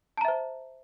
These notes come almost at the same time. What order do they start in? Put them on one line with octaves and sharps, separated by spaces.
A5 A#5 E5 C5